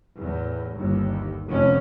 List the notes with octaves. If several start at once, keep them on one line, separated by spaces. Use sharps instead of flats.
E2 A2
G1 D#2
F1 F2 C#4